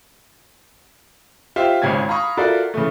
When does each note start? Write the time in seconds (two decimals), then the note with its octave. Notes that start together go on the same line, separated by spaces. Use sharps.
1.56 F4 G4 C5 E5 F5
1.82 G#1 C#2 C#4 G#6
2.08 F5 A#5 B5 C#6 D#6
2.37 F4 F#4 A4 A#4 D5 E5
2.74 C#3 E3 A3